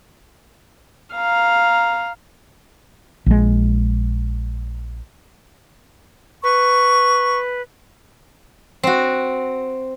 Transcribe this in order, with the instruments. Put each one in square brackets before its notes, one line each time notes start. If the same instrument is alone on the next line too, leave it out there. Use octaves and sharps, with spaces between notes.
[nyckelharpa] F5 A#5
[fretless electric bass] A#1 G#3
[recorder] B4 [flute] C#6
[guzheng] C4 F#4